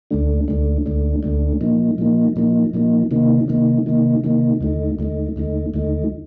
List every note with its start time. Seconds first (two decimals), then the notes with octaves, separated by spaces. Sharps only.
0.11 D2 D3 A3 D4
0.48 D2 D3 A3 D4
0.86 D2 D3 A3 D4
1.23 D2 D3 A3 D4
1.61 A#2 F3 A#3 D#4
1.98 A#2 F3 A#3 D#4
2.36 A#2 F3 A#3 D#4
2.73 A#2 F3 A#3 D#4
3.11 C3 D#3 A#3 D#4
3.48 C3 D#3 A#3 D#4
3.86 C3 D#3 A#3 D#4
4.24 C3 D#3 A#3 D#4
4.61 D#2 D3 A3 D#4
4.99 D#2 D3 A3 D#4
5.36 D#2 D3 A3 D#4
5.74 D#2 D3 A3 D#4